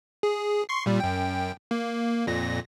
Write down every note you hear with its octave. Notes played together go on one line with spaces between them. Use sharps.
G#4
C6 C#6 C7
A#2 G3
F#2 G5
A#3
F2 A#2 A#6